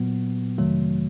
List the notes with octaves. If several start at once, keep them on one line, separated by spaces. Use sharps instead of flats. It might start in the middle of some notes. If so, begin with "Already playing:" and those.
Already playing: A#2 F#3 B3
F2 C3 D#3 F#3 A3